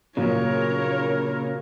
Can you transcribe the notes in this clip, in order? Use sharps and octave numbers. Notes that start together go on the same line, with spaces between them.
A#2 C#3 F#3 A#4 C#5